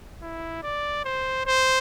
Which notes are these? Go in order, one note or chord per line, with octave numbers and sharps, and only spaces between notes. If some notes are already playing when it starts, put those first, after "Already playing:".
E4
D5
C5
C5